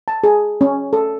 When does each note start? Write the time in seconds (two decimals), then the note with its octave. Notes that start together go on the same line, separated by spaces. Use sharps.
0.08 A5
0.24 G#4
0.61 C#4
0.93 A4